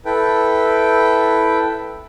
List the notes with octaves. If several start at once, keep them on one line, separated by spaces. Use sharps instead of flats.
E4 A4 B4 G5